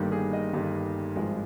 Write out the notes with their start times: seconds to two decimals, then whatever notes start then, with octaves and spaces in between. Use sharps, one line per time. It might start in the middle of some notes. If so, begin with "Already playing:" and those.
Already playing: G1 G2 D#3 G3 A#3
0.12 G#4
0.33 D#5
0.53 G1 G2 D#3 G3 A#3
1.16 G#1 G2 F3 G#3